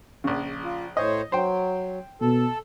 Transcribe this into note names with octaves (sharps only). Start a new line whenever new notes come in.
A#1 C#3
F4
A2 C5 C#5 D#5
F#3 C5 G5
B2 A4